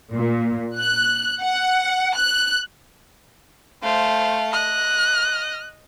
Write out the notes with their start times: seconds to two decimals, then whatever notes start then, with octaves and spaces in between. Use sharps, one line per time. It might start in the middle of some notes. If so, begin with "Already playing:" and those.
0.12 A#2
0.77 F#6
1.42 F#5
2.16 F#6
3.83 A3 C5 F5
4.53 D#5 F#6